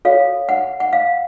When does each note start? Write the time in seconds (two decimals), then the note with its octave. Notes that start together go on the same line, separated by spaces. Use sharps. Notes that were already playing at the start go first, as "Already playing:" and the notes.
0.05 F#4 A4 C#5 F5
0.49 F#5
0.80 F#5
0.93 F5